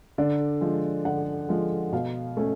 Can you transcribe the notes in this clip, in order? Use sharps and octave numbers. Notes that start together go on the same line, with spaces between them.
D3 D5
F3 G#3
D3 F#5
F3 G#3
B2 F5
A3 C#4